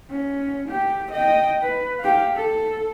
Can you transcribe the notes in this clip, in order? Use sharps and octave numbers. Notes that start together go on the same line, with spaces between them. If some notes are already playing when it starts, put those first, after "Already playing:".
C#4
G4
D#5 G5
B4
G4 F5
A4